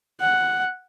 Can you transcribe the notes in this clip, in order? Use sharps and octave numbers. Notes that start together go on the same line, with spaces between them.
F#5